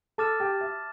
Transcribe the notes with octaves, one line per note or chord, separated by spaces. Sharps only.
A4 A5 D6 F6 A6 E7
G4
E5